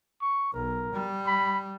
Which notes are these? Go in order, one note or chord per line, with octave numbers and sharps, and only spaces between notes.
C#6
B1 A#4
G3
B5